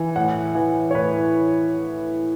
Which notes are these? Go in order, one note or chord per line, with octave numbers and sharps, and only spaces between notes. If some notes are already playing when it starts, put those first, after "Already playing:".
Already playing: E3
A2 F#5
E3
C#5
A2 B4